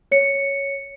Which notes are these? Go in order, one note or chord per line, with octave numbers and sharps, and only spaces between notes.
C#5 C#7